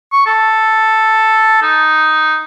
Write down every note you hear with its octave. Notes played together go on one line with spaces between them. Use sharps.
C#6
A4
D#4